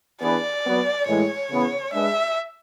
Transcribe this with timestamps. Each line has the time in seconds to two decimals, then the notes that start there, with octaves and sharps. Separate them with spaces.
0.20 E3 B3 D4 G#4 B4 D5
0.63 F#3 B3 F#4 B4
1.06 A2 E3 G#3 C#5
1.49 C#3 E3 B3
1.92 G#3 D4 G#4 B4 E5